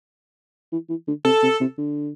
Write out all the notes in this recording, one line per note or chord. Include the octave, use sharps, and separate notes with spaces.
E3
E3
D3
C3 A4
C3
C3
D3